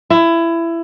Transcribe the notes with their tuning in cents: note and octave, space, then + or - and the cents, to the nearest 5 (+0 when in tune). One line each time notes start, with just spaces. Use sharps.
E4 +20